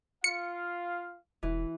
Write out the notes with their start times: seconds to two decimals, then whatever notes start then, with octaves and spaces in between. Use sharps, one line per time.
0.24 F4 F5 C#7
1.43 E1 E3